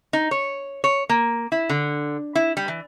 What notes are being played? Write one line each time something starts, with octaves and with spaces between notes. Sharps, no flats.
D#4
C#5
C#5
A#3
E4
D3
E4
G3
E3